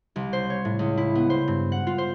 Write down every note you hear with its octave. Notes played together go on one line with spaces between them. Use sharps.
C2
C5
C#5
A2
C#2
E4
B3
C5
G2
F#5
F4
C5